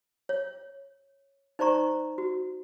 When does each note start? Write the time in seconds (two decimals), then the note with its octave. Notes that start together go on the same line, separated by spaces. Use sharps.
0.29 C#5
1.59 D#4 C5 D5 A#5 C#6
2.18 F#4